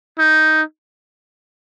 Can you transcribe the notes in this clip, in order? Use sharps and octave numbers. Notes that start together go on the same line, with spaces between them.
D#4